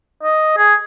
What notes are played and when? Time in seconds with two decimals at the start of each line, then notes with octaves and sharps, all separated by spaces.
0.23 D#5
0.57 G#4